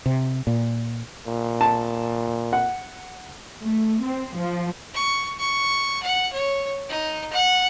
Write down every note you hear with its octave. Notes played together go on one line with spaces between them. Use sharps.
C3
A#2
A#2
A5
F#5
A3
C4
F3
C#6
C#6
F#5
C#5
D#4
F#5